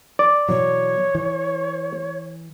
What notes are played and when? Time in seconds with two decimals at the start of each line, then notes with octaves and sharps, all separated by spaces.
0.19 D5
0.49 B2 E3 F#3 C#5
1.15 E3